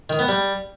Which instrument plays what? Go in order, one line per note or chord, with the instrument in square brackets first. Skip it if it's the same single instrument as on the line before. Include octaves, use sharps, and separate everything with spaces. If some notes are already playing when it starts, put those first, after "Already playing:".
[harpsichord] D#3
B3
G3